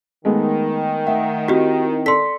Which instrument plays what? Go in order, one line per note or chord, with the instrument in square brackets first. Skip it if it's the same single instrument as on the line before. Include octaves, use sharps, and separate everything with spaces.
[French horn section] D#3 [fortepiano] G#3 A3 B3
[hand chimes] A3 F#5 [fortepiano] E5
[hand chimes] C4 E4 [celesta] F#4 G4
[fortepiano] A4 D5 [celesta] C6 B6